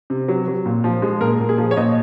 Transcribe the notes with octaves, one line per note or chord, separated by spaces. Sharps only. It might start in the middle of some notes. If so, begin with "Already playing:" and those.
C3
F#3
F#3
A#2
F3
G#3
A#2 A#4
A#2
G#4
F3
C#5
A#2 D#5